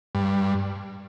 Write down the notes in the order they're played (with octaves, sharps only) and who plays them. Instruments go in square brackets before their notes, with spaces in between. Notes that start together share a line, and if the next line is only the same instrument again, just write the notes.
[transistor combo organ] G2